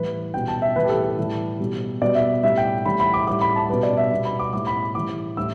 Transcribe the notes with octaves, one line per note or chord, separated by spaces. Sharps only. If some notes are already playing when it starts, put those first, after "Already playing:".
Already playing: A2 E3 G3 B4
B2 G3 G5
A5
E5
A2 E3 G3 B4
G4
A4
A4
A2 E3 G3
B2 G3
B2 G3 D5
E5
A2 G3 E5
G5
A2 E3 G3 B5
B5
D6
A2 G3 D6
B5
A5
B2 G3 B4
D5
E5
B2 G3
B5
D6
A2 G3 D6
B5
A2 E3 G3 D6
A2 G3 E6